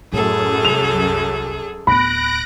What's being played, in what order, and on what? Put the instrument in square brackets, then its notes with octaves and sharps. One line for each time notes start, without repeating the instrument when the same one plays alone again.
[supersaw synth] F#2 [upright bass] A2 [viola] G#4 A4
[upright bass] C2 [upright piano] F7
[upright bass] D1 B3 [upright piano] B5 [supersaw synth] F#6 A#6 D7